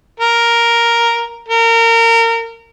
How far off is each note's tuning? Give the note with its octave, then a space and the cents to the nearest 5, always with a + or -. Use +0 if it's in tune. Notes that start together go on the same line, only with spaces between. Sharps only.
A#4 +5
A#4 -25